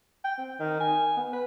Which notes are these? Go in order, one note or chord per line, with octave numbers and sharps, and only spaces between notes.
G5
C4
D#3
G#5
B3
B4